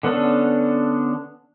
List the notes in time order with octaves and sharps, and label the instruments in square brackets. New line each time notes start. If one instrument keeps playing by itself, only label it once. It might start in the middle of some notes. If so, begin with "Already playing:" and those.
[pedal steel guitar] D3 B3 C#4 D4 A4